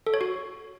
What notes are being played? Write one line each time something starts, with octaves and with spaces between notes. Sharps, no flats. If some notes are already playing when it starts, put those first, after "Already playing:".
A4
C#5
F#4